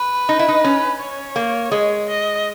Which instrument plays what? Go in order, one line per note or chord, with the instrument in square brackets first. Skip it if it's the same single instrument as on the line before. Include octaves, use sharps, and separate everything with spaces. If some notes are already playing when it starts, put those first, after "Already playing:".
Already playing: [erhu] B4
[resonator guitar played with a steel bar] D#4
E4
D#4
C#4
[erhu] C#5
[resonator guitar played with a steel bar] A#3
G#3
[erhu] D#5